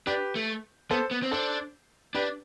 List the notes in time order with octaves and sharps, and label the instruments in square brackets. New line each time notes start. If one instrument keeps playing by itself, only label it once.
[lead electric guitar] D4 [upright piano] G4 B4
[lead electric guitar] A3
[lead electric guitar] B3 [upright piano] A4 C5
[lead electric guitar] B3
C4
[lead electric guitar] D4 [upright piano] A4 C5
[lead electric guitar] D4 [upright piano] G4 B4